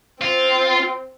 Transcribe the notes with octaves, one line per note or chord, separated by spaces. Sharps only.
C4 F4